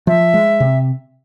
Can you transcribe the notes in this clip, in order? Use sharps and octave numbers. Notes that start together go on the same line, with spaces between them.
F3 E5
G#3
C3